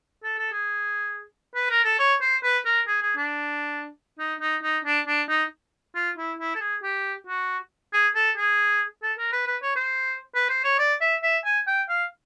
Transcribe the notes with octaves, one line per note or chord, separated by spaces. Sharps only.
A4
A4
G#4
B4
A#4
A4
C#5
C5
B4
A#4
G#4
G#4
D4
D#4
D#4
D#4
D4
D4
D#4
F4
E4
E4
A4
G#4
G4
F#4
G#4
A4
G#4
A4
A#4
B4
B4
C#5
C5
B4
C5
C#5
D5
E5
E5
G#5
G5
F5